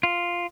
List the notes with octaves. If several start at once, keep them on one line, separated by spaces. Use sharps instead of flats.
F4